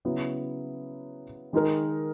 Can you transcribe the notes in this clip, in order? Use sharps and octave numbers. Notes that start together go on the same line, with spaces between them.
C#3 F#3 B3 E4
D#3 G#3 D#4 A#4